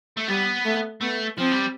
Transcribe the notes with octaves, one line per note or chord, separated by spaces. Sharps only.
A3
G3 B3
A3
A3 B3
F3 C4
G3